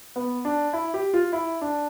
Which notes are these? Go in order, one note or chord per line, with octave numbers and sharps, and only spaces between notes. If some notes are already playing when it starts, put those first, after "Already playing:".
B3
D4
E4
G4
F4
E4
D4